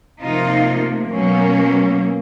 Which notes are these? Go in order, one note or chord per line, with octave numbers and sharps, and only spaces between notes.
C3 F3 A#3 D#4 F4
B2 F#3 A#3 C#4